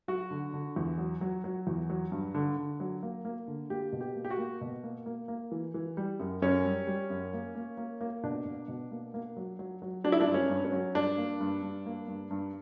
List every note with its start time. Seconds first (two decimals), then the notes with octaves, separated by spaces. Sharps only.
0.08 F#3 F#4
0.31 D3
0.53 D3
0.76 E2
0.98 F#3
1.21 F#3
1.44 F#3
1.67 E2
1.90 F#3
2.12 G2
2.34 D3
2.57 D3
2.80 F#3
3.03 A#3
3.25 A#3
3.48 D3
3.70 A#3 G4
3.92 B2
4.01 G4
4.15 A#3
4.25 G4
4.30 F#4
4.38 A#3
4.61 B2
4.83 A#3
5.06 A#3
5.28 A#3
5.51 E3
5.74 E3
5.97 G3
6.19 F#2
6.42 F#2 C#4
6.64 G3
6.87 G3
7.10 F#2
7.33 A#3
7.55 A#3
7.77 A#3
8.01 A#3
8.23 B2 D4
8.45 B2
8.68 B2
8.91 A#3
9.14 A#3
9.37 F#3
9.59 F#3
9.82 F#3
10.04 F#3 D4
10.12 E4
10.21 D4
10.27 G2
10.34 C#4
10.50 G2
10.65 C#4
10.72 F#3
10.95 G2 D4
11.18 A#3
11.41 G2
11.63 G2
11.86 A#3
12.08 G2
12.31 G2